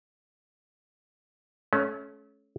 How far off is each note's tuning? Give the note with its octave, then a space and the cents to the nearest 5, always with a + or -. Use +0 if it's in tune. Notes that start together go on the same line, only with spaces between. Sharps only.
A3 -35 C#4 +0